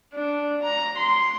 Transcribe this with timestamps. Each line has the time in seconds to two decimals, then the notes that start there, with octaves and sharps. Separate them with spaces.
0.14 D4
0.63 A#5
0.97 C6